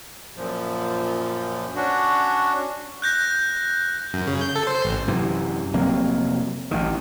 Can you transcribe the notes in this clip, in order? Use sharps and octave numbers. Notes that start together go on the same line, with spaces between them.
F#2 A#2 F3
C#4 D4 F#4
F#6 G6 A#6
F#2
C#3
G6
A4
C5
A1
F#2 C3 E3
F1 C3 F#3 A#3
A1 D#3